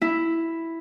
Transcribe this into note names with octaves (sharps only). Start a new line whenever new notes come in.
E4